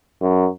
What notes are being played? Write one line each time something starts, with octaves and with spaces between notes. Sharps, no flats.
F#2